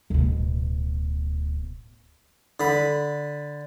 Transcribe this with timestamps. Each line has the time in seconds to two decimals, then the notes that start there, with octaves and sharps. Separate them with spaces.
0.10 D1 B2
2.60 D3 B5